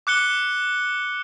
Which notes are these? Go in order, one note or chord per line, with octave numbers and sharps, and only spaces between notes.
D6 F#6 C#7 G7